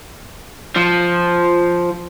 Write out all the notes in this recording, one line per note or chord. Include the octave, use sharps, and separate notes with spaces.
F3